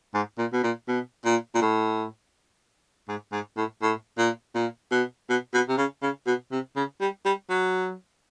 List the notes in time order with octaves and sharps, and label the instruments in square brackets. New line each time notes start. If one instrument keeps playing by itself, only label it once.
[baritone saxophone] G#2
A#2
B2
A#2
B2
A#2
A#2
A2
G#2
G#2
A2
A2
A#2
A#2
B2
B2
B2
C3
C#3
C#3
B2
C3
C#3
G3
G3
F#3